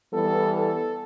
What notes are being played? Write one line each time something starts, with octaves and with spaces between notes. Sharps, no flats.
E3 G3 B3 A4
A4